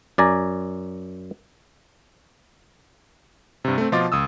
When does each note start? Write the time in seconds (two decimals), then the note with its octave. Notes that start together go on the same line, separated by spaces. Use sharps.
0.18 F#2 D5 G#5 A#5
3.65 G2 C3
3.78 A3 C4
3.92 B2 F3 F4 D#5 D6 A6
4.12 C#2 D#6 E6